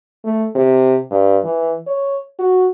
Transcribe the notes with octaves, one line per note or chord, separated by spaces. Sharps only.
A3
C3
G2
E3
C#5
F#4